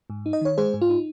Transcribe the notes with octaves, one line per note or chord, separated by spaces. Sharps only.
G#2
D#4
D#5
D#3 C#5
G#3 G#4 C5
G#2
F4
D#4